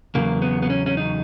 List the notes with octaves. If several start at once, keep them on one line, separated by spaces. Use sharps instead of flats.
E2 C#3 F#3 A#3
B3
B3
C#4
C#4
D#4